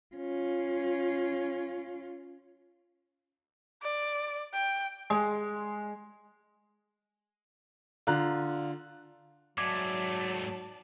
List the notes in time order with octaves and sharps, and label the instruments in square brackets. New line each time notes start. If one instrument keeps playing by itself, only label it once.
[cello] C#4 F4
[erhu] D5
G5
[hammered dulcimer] G#3
[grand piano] D3 F4 A#5 F#6
[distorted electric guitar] G#2 A3 [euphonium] F#3 [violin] D5 A5 [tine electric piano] D6 G#6